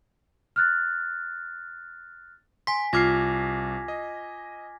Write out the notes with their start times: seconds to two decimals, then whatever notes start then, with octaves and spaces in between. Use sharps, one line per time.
0.56 F6 F#6 A6
2.67 G#5 C6 B6
2.93 C2 F4 D6 F6 G#6 A#6 C7
3.88 D#5